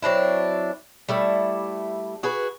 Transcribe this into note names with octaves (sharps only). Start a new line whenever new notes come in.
F#3 C4 D4 E4
G3 A3 E4
F#4 G#4 B4